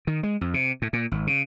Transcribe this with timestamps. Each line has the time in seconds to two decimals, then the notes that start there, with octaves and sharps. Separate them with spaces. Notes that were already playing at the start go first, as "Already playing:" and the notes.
0.07 D#3
0.23 G#3
0.41 F2
0.54 C3
0.82 A2
0.93 A#2
1.11 G#1
1.27 C#3